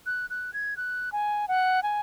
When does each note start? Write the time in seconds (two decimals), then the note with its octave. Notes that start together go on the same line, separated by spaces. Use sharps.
0.06 F#6
0.30 F#6
0.53 G#6
0.77 F#6
1.12 G#5
1.48 F#5
1.83 G#5